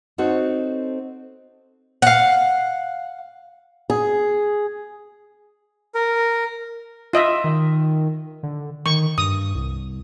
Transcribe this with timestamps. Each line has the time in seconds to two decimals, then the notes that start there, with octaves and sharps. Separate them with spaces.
0.18 C4 D#4 F#4 A4 C#5
2.02 F5 F#5
3.90 G#4
5.95 A#4
7.13 F4 D#5 E5
7.44 D#3
8.43 D3
8.86 D#3 C#6
9.18 G2 D#6
9.55 C2